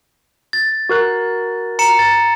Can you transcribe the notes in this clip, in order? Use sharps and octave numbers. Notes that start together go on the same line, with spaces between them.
A6
F#4 A#4 F#6
A#5 C#7 E7
A6